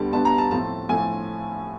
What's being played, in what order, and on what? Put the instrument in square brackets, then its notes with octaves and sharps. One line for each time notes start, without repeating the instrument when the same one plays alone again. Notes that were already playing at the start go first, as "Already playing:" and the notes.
Already playing: [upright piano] D2 D3 G3 B3 A5
D2 D3 G3 B3 A5
A#5
A5
A2 F3 A3 C4 A5
A2 F3 A3 C4 G#5